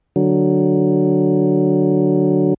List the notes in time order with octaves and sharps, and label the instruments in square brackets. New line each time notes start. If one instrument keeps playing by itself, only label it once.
[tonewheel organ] D3 F#3